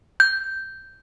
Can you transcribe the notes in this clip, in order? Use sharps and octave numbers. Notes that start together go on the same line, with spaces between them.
G6